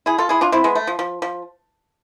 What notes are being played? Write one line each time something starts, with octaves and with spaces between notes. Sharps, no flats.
E4 G#4
F4 A4
E4 G#4
D4 F4
C4 E4
G#3 B3
A3
F3
F3
F3